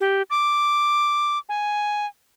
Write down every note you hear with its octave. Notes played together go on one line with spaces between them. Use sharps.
G4
D6
G#5